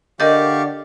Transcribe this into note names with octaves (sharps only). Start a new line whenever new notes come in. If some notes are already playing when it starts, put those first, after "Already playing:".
D3 G4 A#4 D5 D#5 F5 C#6 G6